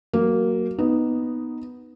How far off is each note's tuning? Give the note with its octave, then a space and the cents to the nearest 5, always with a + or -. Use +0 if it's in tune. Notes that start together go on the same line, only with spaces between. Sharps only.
F#3 +15 A#3 -5
B3 +0 D#4 +0